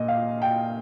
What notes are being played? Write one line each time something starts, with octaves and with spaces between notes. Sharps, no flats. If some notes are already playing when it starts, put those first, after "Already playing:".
Already playing: A#2 D#5
F5
G5